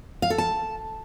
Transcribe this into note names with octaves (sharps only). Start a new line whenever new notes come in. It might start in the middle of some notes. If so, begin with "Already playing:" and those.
F5
A4
A5